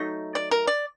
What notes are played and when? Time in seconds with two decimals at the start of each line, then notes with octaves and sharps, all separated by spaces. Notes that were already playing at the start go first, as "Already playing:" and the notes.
Already playing: F#3 A3 D#4
0.35 D5
0.51 A#4
0.67 D5